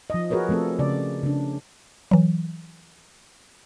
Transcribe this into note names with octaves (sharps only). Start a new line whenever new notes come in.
F3 D#5
F#4 G#4 A#4 B4 C#5
F3 A3 C4 A4
C#3 D5
C#3 D4
E3 F#3